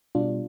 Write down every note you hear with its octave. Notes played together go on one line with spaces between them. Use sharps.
B2 G3 D4 F4